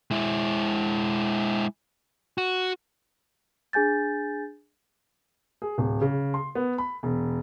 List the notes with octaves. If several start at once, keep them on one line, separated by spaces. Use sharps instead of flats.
G#3 E4
F#4
D4 G#4 G#5 G6 A6
G#4
D1
C#3
C6
B3
B5
E1